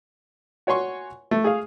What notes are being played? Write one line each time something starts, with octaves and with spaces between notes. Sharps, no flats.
F#4 C#5 G#5 C6 C#6
A3
G#4 F5